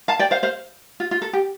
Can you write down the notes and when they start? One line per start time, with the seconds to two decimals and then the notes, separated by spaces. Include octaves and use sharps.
0.08 F5 A5
0.19 D5 G5
0.31 C5 F5
0.43 C5 F5
1.00 F4
1.11 F4
1.22 A4
1.33 G4